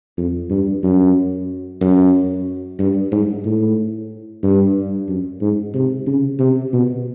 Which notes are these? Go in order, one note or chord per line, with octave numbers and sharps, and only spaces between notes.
F2
G2
F#2
F#2
G2
G#2
A2
G2
F#2
G#2
C3
C#3
C3
B2